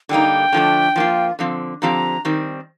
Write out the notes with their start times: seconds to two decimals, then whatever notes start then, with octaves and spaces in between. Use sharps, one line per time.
0.09 D3 G3 A#3 D#4 G5
0.52 D3 F3 A3 D4
0.96 F3 A#3 F4
1.39 D3 F3 C4
1.82 D3 F3 C4 G4 A#5
2.25 D#3 G3 C4